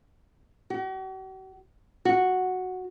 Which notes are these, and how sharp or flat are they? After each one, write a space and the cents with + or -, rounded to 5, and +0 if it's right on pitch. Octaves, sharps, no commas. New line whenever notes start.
F#4 +45
F#4 -5